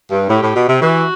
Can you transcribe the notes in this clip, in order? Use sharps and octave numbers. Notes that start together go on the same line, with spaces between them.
G2
A2 G4
A2
B2
C3
E3 F#4